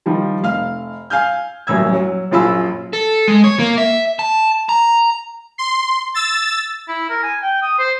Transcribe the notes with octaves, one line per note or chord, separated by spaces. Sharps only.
D#3 F3 G3
F1 F5 F6
F5 G#5 F6 G6
D#1 A1 F#2 E6 G#6
F#3
A#1 F#2 F4 G#5 B5 E6
A4
G#3
C#5
A#3
E5
A5
A#5
C6
E6 A6
E4
A#4
G#5
G5
D#6
C5